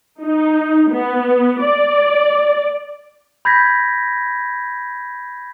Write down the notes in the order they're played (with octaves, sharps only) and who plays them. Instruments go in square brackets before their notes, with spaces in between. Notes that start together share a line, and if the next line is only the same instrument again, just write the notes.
[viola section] D#4
B3
D5
[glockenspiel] B5 G6 G#6 A#6 B6